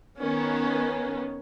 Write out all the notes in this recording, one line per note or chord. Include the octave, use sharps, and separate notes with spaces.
D#3 B3 C#4